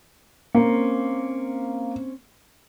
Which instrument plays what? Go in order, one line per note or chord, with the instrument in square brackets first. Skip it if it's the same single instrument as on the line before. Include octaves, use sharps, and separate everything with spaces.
[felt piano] A#3 [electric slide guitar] C4 C#4